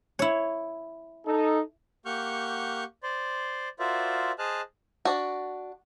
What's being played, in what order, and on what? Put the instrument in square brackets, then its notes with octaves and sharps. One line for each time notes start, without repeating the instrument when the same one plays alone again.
[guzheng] E4 C#5
[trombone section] D#4 A4
[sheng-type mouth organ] A#3 G4 F#5 C#6 F6 G6
C5 D5 C6
F4 F#4 A#4 C5 D5 E5
G#4 C5 D#5 A5 F6 F#6
[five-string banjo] D4 F#4